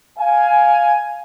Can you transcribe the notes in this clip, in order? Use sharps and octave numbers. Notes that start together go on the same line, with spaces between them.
F5 G#5